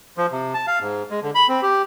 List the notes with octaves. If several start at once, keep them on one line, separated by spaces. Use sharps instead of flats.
F3
C3
A5
F5
G#2
G#3
D3
B5
C4
G4